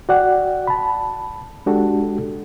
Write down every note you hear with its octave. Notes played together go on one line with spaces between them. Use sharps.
F#4 D5 F#5 G5
A5 B5
G#3 D4 F#4 G4 A4